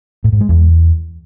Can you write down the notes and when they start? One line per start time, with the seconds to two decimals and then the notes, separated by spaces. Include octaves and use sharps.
0.24 A2
0.33 G#2
0.41 G#3
0.49 E2